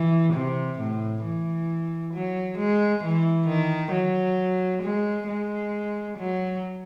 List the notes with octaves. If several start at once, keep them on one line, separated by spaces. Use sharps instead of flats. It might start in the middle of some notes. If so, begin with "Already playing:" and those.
Already playing: E3
C3
A2
E3
F#3
G#3
E3
D#3
F#3
G#3
G#3
F#3